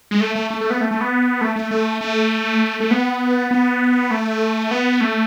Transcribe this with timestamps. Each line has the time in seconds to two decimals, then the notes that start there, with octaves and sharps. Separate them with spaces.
0.11 G#3
0.21 A3
0.36 A3
0.50 A3
0.61 A3
0.70 B3
0.81 A3
0.91 A3
1.01 B3
1.41 A3
1.56 A3
1.71 A3
2.01 A3
2.80 A3
2.91 B3
3.51 B3
4.11 A3
4.71 B3
5.01 A3